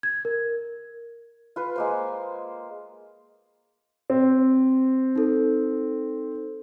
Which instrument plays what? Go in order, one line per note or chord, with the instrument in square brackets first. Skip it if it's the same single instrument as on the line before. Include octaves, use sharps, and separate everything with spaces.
[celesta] G#6
A#4
[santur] F4 B4
G#3 A#3 C5
[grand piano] C4
[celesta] D#4 A4